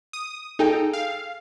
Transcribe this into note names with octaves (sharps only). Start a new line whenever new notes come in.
D#6
D#4 G#4 A4 G5
F5